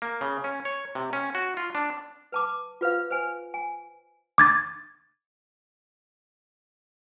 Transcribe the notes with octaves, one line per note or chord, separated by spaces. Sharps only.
A#3
C#3
C#4
C#5
C3
C#4
F#4
F4
D4
B4 A5 D6
F4 B4 C5 F5
B4 C5 G#5
G#5
D6 G#6 A6